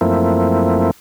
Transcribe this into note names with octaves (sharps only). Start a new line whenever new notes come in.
F#2 F3 A3 A#3 C4 E4